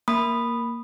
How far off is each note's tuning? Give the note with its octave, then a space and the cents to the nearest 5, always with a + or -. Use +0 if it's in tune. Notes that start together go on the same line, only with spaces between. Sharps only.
A#3 +0 B5 +0 D#6 -15